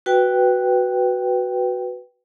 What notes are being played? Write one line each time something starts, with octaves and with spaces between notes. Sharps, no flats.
F#4 B4 G5